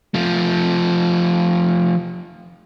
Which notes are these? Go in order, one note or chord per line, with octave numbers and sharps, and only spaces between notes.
F3 A3